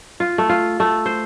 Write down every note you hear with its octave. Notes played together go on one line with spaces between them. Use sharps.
F4
A3
F4
A3
C5